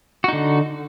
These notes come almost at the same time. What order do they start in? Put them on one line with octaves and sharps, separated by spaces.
F#4 D#4 D3